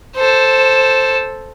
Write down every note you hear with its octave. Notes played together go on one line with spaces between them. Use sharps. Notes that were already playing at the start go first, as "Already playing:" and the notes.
A4 C5